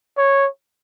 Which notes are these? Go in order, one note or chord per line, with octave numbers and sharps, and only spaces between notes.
C#5